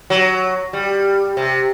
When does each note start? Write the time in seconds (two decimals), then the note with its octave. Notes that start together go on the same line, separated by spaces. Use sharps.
0.10 F#3
0.73 G3
1.37 C3